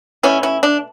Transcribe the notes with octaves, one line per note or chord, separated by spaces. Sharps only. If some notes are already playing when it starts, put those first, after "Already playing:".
B2 A3 C#4 E4
C#4 E4
D4